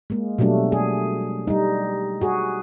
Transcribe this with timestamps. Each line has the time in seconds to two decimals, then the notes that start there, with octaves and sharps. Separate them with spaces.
0.10 G#3 A#3
0.39 B2 F#3 G3 A3 D4
0.72 G#4
1.47 G3 D#4
2.21 F#4 G#4